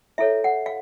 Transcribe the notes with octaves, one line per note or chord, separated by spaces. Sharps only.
E4 A4 C#5 E5
F#5
F5